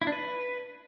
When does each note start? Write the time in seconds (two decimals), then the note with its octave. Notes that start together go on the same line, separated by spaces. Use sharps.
0.02 E4
0.07 D4
0.12 B4